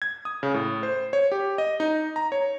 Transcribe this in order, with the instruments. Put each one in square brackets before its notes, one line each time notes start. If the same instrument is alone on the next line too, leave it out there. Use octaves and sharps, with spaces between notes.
[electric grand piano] G#6
D#6
C#3
A2
C5
C#5
G4
D#5
D#4
A#5
C#5